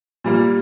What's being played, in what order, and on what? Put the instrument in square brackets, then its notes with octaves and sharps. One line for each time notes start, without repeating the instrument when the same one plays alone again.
[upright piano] A#2 G3 A#3